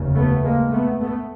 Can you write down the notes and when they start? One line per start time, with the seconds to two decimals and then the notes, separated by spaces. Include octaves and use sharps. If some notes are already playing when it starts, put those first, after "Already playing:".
Already playing: F1 D#2 C#3
0.15 A3 B3
0.43 G#3 A#3
0.72 A3 B3
1.01 A3 B3